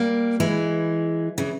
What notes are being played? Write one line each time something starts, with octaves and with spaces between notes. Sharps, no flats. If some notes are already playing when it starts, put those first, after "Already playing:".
Already playing: G3 A#3
E3 G#3
C#3 E3